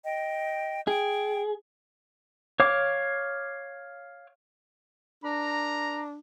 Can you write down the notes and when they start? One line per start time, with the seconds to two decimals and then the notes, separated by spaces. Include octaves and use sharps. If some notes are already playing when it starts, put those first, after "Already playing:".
0.04 D#5 G5
0.87 G#4 G5
2.60 C#5 F5 D6
5.24 D4 A#4 A#5